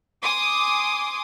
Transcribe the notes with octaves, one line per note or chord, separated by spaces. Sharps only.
G#5 C6 D6 D#6